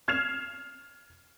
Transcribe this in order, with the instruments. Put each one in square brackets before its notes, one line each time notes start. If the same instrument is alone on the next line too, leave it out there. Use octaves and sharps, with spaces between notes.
[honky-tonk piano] F6 G#6 C7 E7 F7